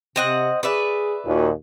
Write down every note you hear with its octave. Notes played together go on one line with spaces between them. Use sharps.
C3 C4 D#5 F#5
G#4 B4 D5 E5
D#2 A#2 F#4